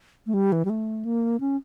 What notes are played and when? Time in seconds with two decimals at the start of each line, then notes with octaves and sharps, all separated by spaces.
0.27 A3
0.34 G3
0.52 E3
0.65 G3
0.70 A3
1.05 A#3
1.40 C#4